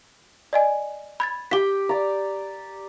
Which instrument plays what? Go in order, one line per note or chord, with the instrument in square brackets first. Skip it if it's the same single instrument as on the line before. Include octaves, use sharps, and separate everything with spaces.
[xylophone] D5 D#5 G#5
B5 G#6 A6
[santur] G4 G5 [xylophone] B6 G7
[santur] D5 A#5